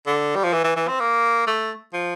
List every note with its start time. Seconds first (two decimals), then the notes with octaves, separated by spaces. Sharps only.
0.07 D3
0.35 G3
0.44 F3
0.53 E3
0.64 E3
0.76 E3
0.88 C4
1.00 A#3
1.47 A3
1.93 F3